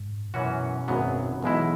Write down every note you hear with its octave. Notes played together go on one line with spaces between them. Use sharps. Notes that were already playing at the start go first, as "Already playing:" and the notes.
Already playing: G#2
F#2 B2 E3 C#4 F#4
G#1 F#2 F#3 B3
B1 B2 E3 G#3 E4